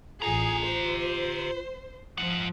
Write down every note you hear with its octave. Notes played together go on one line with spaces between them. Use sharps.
A1 F4 G4 G#4 A#5
C5
G#2 F3 F#5